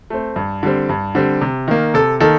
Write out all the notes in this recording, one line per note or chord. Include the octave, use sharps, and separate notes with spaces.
A3 C4
G2
D3 G3 C4
G2
D3 G3 C4
C3
D#3 A#3
C3 A4
D#3 A#3 A4